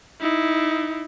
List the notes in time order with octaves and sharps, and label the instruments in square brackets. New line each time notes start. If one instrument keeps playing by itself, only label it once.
[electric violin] D#4 E4